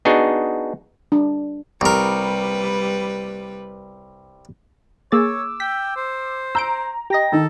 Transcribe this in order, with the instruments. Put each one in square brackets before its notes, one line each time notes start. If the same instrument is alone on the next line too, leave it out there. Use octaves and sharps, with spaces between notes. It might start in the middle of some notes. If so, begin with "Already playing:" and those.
[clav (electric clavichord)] B3 D4 D#4 F#4 G#4
[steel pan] D4
[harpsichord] C2 A#4 [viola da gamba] G3 B4
[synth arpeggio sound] A#3 G#4 A6 [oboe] C#5 [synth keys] D6 E6
[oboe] G5 [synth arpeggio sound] B6
[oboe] C5
[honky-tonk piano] A#5 [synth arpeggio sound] E6 G6 D7
[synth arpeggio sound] G4 D#5 [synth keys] G5 A#6
[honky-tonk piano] D#3 D#4 [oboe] A4